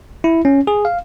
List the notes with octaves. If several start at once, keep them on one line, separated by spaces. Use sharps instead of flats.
E4
C#4
G#4
F5